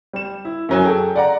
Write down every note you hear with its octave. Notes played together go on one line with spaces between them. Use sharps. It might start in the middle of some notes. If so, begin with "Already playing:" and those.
G3 E7
E4
F#2 F#3 G#5
G#4 A4 G5
D5 F#5 A#5